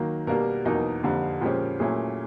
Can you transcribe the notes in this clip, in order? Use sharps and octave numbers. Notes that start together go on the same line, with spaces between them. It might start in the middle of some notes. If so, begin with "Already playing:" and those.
Already playing: D#3 F#3 A#3
B2 G3 A#3 D4 A#4
E2 B2 F#3 A#3 D#4 A#4
F2 D3 G3 A#3
A#2 F3 G#3 C#4 G4
A#2 F#3 A3 C#4 E4 G#4